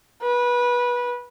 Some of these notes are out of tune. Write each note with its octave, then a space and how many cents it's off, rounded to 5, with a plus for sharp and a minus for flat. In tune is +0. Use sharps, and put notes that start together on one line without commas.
B4 -20